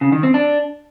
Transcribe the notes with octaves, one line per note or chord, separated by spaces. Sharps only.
C#3
D#3
C4
D4